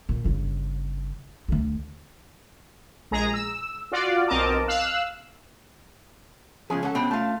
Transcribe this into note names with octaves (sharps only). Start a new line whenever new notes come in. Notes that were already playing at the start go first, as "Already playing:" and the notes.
A#2
G1 C#3
D2 D3
A#1 G#3 G#4 A#5
E6
F4 F#4 D5 F5
B1 C4 A#4 D#5 A5 D6
F5 E6 F#6
C#2 F3 G#3 C#4 F4 G#4
C#4 A4 F#5
B2 G3 C4 D4
A3 F4 F5 A5